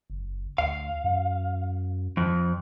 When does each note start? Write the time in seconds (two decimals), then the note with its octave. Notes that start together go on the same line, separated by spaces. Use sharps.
0.10 F#1
0.58 D2 F5
1.04 F#2
2.17 F2